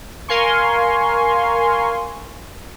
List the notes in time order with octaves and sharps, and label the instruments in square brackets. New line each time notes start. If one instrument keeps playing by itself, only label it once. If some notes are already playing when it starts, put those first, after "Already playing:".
[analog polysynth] A#4 F5 G#5 C6 C#6